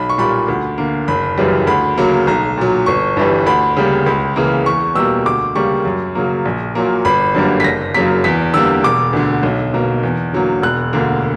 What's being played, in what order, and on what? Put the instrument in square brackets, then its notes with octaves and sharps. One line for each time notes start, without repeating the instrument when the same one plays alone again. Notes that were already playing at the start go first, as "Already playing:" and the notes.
Already playing: [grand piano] B1 B5
C#6
A#2 G3 A#3 B5
D2
D3 A#3
F#1 B5
F#2 C#3 E3 G3
D2 B5
C#3 F#3 A#3
B1 A#5
A#2 F#3
G1 C#6
G2 E3 G3
D2 B5
C#3 G3 A#3
C#2 B5
C#3 E3 A#3
E2 C#6
B2 G3 A#3 E6
D2 D6
C#3 G3 A#3 C#6
F#2
C#3 F#3 A#3
A#1
A#2 F#3 A#3
G1 B5
F#2 D3 G3 A#3
B6
F#1 A#6
F#2 C#3 F#3 A#3 B6
E2 B6
D3 G3 A#3 E6
E1 D6
D2 D3
B1
B2 A#3
E2
D3 F#3 A#3
E1 F#6
D2 D3 A#3